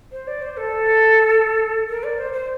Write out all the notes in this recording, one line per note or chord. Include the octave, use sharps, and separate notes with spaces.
C5
D5
C5
A4
A#4
D5
C5
C5